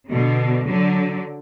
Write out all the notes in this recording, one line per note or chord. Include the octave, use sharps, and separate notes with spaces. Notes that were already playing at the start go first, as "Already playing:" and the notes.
B2 D3
D3 F#3